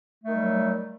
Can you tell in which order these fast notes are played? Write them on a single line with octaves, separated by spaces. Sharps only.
A3 D#3 G3 F#3